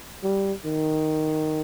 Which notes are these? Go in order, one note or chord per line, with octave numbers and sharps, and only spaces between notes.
G3
D#3